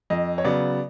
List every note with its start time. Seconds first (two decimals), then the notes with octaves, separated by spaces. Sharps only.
0.10 F2 D#5
0.38 C#5
0.44 C#3 F#3 B3 D5